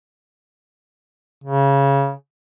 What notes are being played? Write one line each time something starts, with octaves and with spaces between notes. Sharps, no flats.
C#3